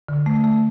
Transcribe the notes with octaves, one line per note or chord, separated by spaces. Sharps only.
D3
A3
A3